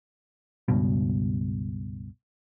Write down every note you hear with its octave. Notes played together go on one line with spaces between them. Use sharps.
C#2 G2 B2